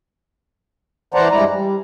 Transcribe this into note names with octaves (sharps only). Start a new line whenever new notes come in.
E3 C5 D5 F#5 A5 A#5
G2 G#3 E4 D5 A#5
G3